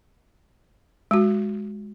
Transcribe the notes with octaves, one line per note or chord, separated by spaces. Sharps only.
G#3 F#4